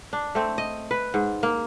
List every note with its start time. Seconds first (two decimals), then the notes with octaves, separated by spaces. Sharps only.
0.13 D4
0.35 A3 C4
0.58 D#5
0.91 B4
1.14 G#2
1.43 A#3